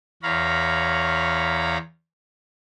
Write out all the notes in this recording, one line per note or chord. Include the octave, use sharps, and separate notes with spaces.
E2 C#5 F5 A#5 B5